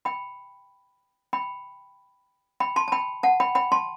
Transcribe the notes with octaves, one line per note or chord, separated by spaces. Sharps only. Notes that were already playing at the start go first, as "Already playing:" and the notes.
G5 B5
G5 B5
G5 B5
A5 C6
A5
G5 B5
F#5 A5
G5 B5
G5 B5
A5 C6